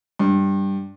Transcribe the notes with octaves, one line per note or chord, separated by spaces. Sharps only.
G2